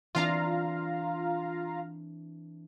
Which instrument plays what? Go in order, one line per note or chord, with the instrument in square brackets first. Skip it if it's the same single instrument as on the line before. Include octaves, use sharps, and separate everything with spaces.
[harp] E3 C4 D4 [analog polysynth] F4 F5 A#5